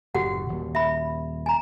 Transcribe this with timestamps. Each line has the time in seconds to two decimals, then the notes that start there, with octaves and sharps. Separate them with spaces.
0.15 F#1 F#2 A2 F#4 G4 F#5
0.49 D#1
0.75 E5 B5
1.46 G#5 A#5